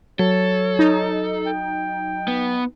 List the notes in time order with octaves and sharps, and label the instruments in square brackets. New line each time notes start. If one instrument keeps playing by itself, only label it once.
[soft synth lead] F#3 [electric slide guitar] A4 [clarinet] C#5
[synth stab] D#4
[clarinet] G5
[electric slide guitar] B3